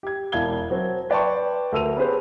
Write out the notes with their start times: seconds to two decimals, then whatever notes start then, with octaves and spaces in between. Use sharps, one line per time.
0.03 G4 G#6
0.32 E1 E4 F5 G#6 G7
0.70 F#3 C4 A#4
1.10 B4 D5 G5 A5 C6 C#6
1.72 D2 A4 A#4 E6 D#7 F7
1.97 B3 C#4 G4 G#4 B4 C5